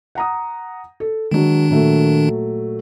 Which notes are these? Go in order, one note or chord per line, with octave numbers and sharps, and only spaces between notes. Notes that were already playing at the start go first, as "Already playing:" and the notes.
F#5 A#5 D#6
A4
D#3 F#3 G#3 D4
A#2 F#3 A3